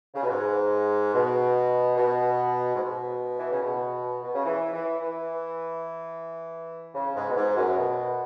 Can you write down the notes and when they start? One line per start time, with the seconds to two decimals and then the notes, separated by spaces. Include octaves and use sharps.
0.15 C#3
0.23 B2
0.31 G#2
1.14 B2
1.97 B2
2.75 G#2
2.80 B2
3.40 E3
3.51 C#3
3.63 B2
4.23 B2
4.34 C#3
4.45 E3
4.73 E3
5.01 E3
6.94 C#3
7.15 G#2
7.30 B2
7.36 G#2
7.57 F#2
7.78 B2